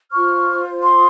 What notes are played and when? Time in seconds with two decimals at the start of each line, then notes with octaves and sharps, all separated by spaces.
0.11 F4 C5 C#6 F6
0.83 C6 D#6